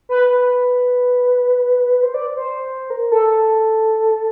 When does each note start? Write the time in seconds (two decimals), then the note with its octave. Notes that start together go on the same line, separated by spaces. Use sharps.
0.09 B4
0.30 B4
2.03 C5
2.14 D5
2.36 C5
2.90 A#4
3.12 A4